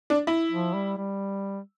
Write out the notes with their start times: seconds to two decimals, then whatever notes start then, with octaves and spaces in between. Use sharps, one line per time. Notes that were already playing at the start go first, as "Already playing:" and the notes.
0.10 D4
0.27 E4
0.51 F3
0.74 G3
0.97 G3